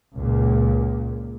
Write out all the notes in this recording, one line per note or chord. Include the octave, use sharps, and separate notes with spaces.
C#2 A#2